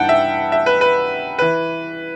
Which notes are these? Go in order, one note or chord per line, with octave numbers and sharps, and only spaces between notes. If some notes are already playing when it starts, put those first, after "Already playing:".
Already playing: G2 E3 G3 D#4 F#5 G5 A5
E5
E5
B4
B4
E3 B4